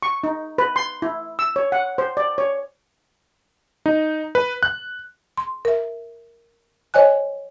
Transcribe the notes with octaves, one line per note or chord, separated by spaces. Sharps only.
C#6
D#4
B4
C6
E4
E6
C#5
F#5
C5
D5
C#5
D#4
B4
F#6
C6
A#4 E5
C5 C#5 D#5 G#5 F#6